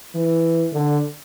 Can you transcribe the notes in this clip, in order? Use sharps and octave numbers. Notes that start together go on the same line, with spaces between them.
E3
D3